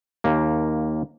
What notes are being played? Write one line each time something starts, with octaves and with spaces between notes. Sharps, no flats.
D#2 A#3